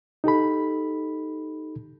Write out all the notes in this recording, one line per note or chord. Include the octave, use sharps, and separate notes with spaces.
D#4 G4 A4 B5